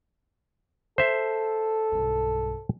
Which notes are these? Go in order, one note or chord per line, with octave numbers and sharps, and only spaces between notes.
A4 C5 E5
B1 G2